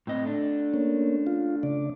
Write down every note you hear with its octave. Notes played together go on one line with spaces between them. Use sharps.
A2 C4 D#5
A3 D4
A#3 C#4
F4
C#3 D5